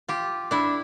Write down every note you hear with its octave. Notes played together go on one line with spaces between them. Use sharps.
F4 G4
D4 E4